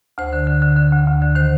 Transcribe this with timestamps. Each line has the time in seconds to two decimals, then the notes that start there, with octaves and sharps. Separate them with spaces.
0.18 D2 C5
0.33 D3
0.47 D3
0.62 D3
0.77 D3
0.92 D2
1.07 D2
1.22 D3
1.35 D#3 C5